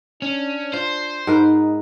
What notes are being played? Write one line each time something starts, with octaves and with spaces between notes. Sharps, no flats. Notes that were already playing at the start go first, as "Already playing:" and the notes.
C#4 D4
F4 C5
G#2 D#4 A#4 B4